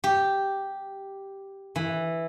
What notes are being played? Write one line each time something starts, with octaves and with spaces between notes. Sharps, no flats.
G4
E3